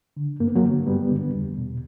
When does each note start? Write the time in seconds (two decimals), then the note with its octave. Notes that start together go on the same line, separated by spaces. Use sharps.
0.17 D3
0.40 G2 A#3
0.48 B3
0.55 F#3 A#3
0.63 D3
0.87 G2 G3 B3
1.11 D3
1.34 E2
1.58 B2